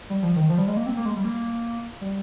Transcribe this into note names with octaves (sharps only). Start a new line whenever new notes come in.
G3
F3
D#3
F3
G3
G#3
A#3
C4
A#3
G#3
G3
A#3
G3